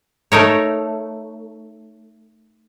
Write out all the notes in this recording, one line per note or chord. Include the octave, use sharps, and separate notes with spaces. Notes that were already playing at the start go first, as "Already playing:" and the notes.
A3 D#4 A#4 C#5